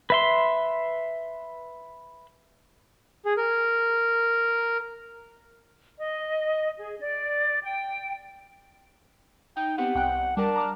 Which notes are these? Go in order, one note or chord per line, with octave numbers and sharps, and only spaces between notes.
B4 E5 C6
G#4
A#4
D#5
G#4
D5
G5
D#4 G5
B3 C4 G4 F#5
C2 G5 F#6
G3 D4 A#4 A5
A#5 D6 F6